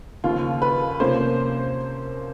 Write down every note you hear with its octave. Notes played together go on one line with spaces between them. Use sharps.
D#2 C#3 F3 F4
B4
C3 F3 A#3 C#4 C5